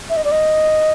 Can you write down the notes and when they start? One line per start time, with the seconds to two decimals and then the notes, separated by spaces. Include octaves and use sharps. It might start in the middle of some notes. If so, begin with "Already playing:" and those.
0.09 E5
0.17 D#5
0.24 D5
0.32 D#5